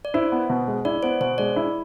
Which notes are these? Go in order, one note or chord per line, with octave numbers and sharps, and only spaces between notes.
D5
E4 C5
B3
B2
G#3
E4 D5
B3 C5
B2 C5
G#3 D5
E4